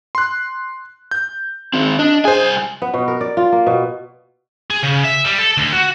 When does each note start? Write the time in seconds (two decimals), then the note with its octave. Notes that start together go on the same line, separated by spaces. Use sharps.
0.15 C6 F#6
1.11 G6
1.73 D#3 C4
1.99 D4 D#5
2.25 C2 G#4 C5 G#5
2.82 B3
2.94 B2
3.08 A#4
3.21 D5
3.37 F4
3.52 A#3
3.67 B2
4.70 G#4
4.83 C#3
5.04 E5
5.24 G3
5.38 A4
5.57 D2
5.73 F#4